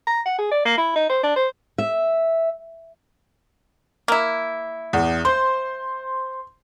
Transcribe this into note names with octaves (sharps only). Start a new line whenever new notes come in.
A#5
F#5
G#4
D5
A#3
E4
D#4
C5
D4
C5
E5
A#3 E4
E2
C5 C6